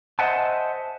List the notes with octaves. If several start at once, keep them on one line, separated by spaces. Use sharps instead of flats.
C5 D#5 E5 F#5 G#5 A5